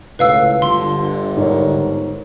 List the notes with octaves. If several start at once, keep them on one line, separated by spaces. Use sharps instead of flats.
C#2 A2 B4 F5 E6
G1 D3 F4 C6
G#2 A#4 C#5